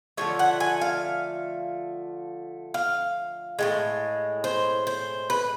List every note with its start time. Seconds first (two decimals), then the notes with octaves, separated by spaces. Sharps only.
0.17 D3 F3 A3 C#5
0.39 F#5
0.60 G#5
0.81 F5
2.74 F5
3.59 A2 E3 G#3
4.44 C5
4.87 C5
5.30 B4